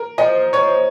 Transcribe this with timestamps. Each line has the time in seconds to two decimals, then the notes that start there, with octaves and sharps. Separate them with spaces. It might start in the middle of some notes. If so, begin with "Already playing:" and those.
Already playing: A#4
0.18 F3 D#5
0.53 F3 C#5